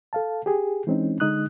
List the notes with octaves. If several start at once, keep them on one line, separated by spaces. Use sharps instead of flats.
A4 F5 A5
G4 G#4
E3 G#3 C4 C#4 D#4
D3 G#3 D#4 D#6 F#6